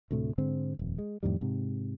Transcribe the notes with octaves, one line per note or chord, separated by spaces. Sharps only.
D2 A2 C3 A3
G#2 D3 G#3 C4
D#1 F2
G#3
F2 A2 D#3 G3
G#2 C3